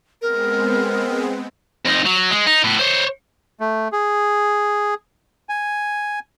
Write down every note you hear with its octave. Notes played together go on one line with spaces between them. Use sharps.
G#3 B3 C4 A#4
F2 D#4
F#3
G#3
D#4
A2 B3
C5 C#5
A3
G#4
G#5